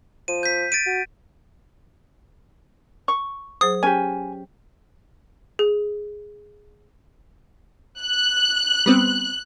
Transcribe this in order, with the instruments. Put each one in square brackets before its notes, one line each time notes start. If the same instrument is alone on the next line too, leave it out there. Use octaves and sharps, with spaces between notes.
[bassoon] F3 [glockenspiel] D#7
[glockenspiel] G6 B6
A6 D7 D#7
[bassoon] F#4
[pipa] C#6
[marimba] F#3 G#4 C5 [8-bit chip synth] D#6
[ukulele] C#4 G4 [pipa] G#5 [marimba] G#6
[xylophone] G#4
[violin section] F#6
[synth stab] G3 B3 C4